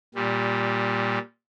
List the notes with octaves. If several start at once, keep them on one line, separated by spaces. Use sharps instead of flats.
A#2 G3